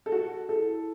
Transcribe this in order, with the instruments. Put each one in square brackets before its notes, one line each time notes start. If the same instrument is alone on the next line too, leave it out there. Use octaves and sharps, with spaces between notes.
[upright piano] A4
F#4
[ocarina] F#4 [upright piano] A4
[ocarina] E4